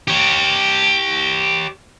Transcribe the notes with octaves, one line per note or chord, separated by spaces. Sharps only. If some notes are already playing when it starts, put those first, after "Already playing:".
G4 C#5